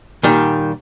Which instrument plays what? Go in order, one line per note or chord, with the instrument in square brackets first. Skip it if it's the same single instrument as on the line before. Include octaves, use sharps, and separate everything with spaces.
[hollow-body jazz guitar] A#2 D#3 G3